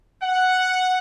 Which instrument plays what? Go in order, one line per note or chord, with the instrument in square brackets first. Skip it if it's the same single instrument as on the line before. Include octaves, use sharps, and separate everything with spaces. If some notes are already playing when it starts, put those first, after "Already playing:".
[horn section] F#5